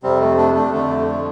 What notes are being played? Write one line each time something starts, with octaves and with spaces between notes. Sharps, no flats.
F2 C3 G3 C4
A3
A3 D4
A3 D4
F2 D3 A3
A3